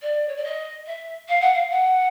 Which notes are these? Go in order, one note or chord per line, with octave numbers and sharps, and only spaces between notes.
D5
C#5
D5
D#5
E5
F5
F#5
F5
F#5